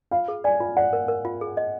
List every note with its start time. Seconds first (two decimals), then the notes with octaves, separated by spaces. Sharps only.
0.11 F4 F5
0.28 G#4
0.44 D5 G#5
0.60 F4
0.77 D5 F#5
0.93 A#4
1.08 A#4
1.25 F4
1.41 G#4
1.57 D#5